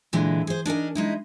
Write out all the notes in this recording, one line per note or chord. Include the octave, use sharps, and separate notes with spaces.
A#2 D3 E3 G#3
G#4 C5
D4 D#4 A#4 G#5
G#3 D#4 E4